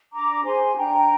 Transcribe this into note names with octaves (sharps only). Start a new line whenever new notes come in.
D4 A#5 D6
G#4 C5 G#5 C6
D4 G5 A#5